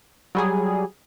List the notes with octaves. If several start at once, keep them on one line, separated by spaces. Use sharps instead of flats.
F#3 G3 G#4